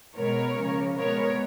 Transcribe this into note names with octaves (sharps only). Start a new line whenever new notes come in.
B2 G#3 B3 A#4 C#5
C#3 F3 A#3
B2 G#3 B3 A#4 C#5